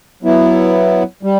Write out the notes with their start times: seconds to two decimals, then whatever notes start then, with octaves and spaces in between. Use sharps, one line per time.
0.23 F#3 B3 E4
1.23 G3